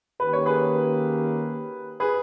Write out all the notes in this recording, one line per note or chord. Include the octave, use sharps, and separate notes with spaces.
D#3 A#3 C#4 G4 B4
C#5
G#4 B4
G#4 B4